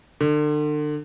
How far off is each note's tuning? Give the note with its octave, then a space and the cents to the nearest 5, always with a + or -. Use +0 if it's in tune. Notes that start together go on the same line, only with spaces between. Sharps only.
D3 +35